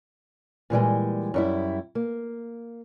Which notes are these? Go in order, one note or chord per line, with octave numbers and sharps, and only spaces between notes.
A#2 E3 G3 G#3
F#2 G3 E4
A#3